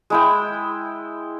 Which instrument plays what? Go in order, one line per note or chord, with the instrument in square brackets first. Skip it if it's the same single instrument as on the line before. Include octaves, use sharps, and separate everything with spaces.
[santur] G#3 E4 G5